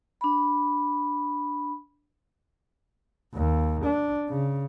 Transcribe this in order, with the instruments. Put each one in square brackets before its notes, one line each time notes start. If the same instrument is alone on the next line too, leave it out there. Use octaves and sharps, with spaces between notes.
[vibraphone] D4 B5
[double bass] D#2
D4
C#3